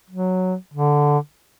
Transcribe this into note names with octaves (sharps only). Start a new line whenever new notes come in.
F#3
D3